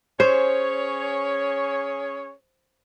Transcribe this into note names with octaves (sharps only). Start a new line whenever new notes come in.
C#4 G#4 C5 C#5